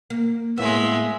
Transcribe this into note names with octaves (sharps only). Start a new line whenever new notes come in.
A#3
A2 G#3 A#3 B3 E5 E6